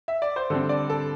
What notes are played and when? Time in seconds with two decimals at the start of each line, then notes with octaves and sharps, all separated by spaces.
0.08 E5
0.22 D5
0.36 C5
0.50 D3 G3 C4 A4
0.69 D5
0.90 A4